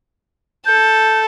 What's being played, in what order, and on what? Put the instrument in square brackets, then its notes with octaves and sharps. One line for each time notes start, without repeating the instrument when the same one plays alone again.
[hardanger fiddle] A4 [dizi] G6